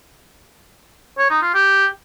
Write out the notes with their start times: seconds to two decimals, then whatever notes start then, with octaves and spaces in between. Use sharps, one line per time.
1.18 C#5
1.30 D#4
1.42 F4
1.54 G4